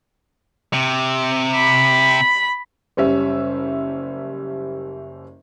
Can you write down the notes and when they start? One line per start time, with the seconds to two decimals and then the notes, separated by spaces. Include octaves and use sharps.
0.73 C3
1.54 B5
2.97 F#1 G3 C#4 E5